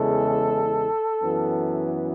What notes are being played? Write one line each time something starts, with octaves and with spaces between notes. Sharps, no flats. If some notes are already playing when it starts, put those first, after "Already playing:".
Already playing: E2 C#3 E3 G#3 A4
F#2 E3 B3